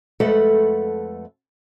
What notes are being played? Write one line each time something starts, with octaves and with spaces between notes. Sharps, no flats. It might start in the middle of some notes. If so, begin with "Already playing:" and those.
F2 G#3 A3 A4 B4 F#5